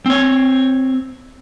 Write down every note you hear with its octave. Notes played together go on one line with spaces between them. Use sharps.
C4 C#5